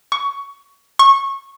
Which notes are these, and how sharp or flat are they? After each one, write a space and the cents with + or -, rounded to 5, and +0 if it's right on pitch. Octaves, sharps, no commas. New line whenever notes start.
C#6 +20
C#6 -15